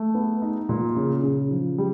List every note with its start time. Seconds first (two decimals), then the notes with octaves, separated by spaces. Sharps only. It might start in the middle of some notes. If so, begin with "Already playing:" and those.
Already playing: A3
0.15 B3
0.42 D#4
0.69 A#2
0.97 C#3
1.23 C#3
1.51 F3
1.78 G3